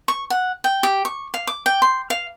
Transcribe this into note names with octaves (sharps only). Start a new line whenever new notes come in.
C#6
F#5
G5
G4
C#6
F5
D6
G5
C6
F5